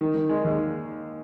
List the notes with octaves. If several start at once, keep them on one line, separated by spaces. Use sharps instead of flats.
D#3
D#3
G#3
D#2